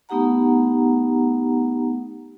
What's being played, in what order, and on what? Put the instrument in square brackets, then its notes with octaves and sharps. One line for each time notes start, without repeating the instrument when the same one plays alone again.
[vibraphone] A3 B3 D#4 G4 F#5 A#5